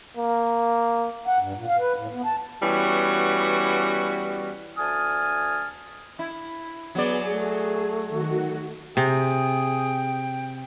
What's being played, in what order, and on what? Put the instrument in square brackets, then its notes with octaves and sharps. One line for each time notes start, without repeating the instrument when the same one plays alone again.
[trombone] A#3
[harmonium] F#5
G2
A#2
F5
B4
A2
B3
A5
[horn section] E3 G3 B3 C#4 F#4
[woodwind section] D2 G#5 A5 D#6 F6
[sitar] E4
[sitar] F#3 D5 [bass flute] B3 [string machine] G#4
[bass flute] A3
[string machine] D#3 F#4
[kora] C3 [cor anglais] G#4 [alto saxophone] G5